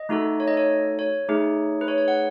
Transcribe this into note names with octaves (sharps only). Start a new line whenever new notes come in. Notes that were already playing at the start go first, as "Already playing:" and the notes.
Already playing: D#5
A3 D#4 F#4 A4
C#5
D#5
C#5
C#5
A3 D#4 G#4
B4
C#5
C#5
F#5